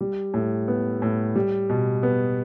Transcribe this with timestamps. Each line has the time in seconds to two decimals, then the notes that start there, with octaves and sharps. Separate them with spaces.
0.01 G3
0.34 A2
0.68 B3
1.02 A2
1.35 G3
1.70 B2
2.03 B3